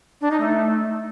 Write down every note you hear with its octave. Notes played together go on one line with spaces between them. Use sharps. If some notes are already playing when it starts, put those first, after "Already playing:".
D4
D#4
A3